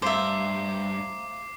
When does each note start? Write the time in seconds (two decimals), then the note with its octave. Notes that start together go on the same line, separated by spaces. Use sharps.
0.02 G2 A3 C5 E5 F5 A#5 D6 C7